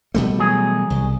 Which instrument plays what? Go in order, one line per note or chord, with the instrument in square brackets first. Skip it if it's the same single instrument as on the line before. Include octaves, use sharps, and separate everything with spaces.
[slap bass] B2 G3 A3
[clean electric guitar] E3 F#3 G#4
[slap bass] C2